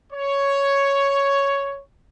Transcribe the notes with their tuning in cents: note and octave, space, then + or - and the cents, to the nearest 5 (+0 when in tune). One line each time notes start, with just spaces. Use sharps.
C#5 +5